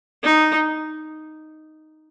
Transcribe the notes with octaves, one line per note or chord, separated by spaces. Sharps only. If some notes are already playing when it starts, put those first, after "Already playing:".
D#4